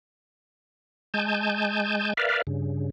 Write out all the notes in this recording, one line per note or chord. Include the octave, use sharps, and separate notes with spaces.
G#3 G#5 A5 G6
A#4 B4 D5 E5 F5
G2 C#3